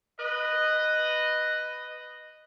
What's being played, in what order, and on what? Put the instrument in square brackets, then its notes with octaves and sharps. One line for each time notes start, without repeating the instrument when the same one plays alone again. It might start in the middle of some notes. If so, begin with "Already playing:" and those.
[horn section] B4 D#5